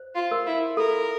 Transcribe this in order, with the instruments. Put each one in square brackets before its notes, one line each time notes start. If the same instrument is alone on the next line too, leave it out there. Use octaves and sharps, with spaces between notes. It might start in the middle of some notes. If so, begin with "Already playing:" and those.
Already playing: [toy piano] C5
[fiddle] F4
[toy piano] A#4
[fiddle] E4
[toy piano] A4 [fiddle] A#4